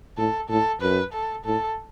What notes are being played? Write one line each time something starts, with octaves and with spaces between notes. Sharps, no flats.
A2 A4
A2 A4
F#2 B4
A4
A2 A4